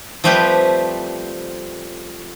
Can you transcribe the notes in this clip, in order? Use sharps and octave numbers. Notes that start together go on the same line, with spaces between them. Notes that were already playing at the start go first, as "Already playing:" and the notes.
F3 G3 A3 C4 G4 B4